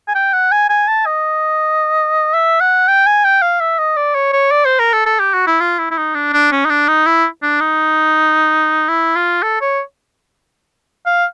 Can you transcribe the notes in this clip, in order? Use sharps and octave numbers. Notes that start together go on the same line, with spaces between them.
G#5
G5
F#5
G#5
G#5
A5
D#5
E5
F#5
G5
G#5
G5
F5
E5
D#5
D5
C#5
C#5
D5
C5
A#4
A4
A4
G4
F#4
E4
F4
E4
E4
D#4
D4
D4
C#4
D#4
D4
D#4
E4
D4
D#4
E4
F4
A4
C#5
F5